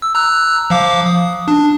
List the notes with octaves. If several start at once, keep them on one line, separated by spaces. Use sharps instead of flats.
E6
A#5 E6 F#6
F3 F5 D6
D#6
D4